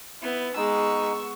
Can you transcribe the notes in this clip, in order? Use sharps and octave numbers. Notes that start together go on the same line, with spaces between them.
B3 E4
G#3 B3 D#4 C#6 E6